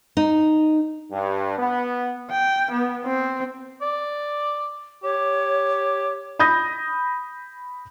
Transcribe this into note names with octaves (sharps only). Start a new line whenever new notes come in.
D#4
G2
B3
G5
B3
C4
D5
G4 C#5
B5 D#6 G6 A#6